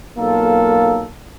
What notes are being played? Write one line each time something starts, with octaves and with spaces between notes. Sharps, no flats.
B1 A#3 F4 A4